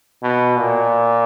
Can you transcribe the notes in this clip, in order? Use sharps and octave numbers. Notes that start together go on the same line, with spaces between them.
B2
A#2